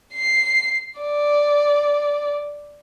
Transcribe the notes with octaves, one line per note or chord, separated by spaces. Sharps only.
C7
D5